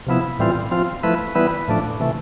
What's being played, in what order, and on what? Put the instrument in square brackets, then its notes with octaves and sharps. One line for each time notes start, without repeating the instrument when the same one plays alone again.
[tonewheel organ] C3 F3 B3 E4
A2 E3 G3 C4 F4
F3 C4 F4
F3 A3 E4 B4
E3 G3 B3 E4 B4
A2 F3 A3 D4
C3 E3 A3